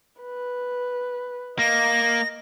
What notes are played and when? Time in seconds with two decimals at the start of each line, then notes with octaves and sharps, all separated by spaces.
0.21 B4
1.59 A#3 D#5 A#6